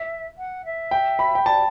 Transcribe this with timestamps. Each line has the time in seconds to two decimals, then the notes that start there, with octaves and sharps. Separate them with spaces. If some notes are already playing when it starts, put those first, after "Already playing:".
Already playing: E5
0.37 F#5
0.65 E5
0.91 G5
1.19 B5
1.35 G5
1.46 D5 A5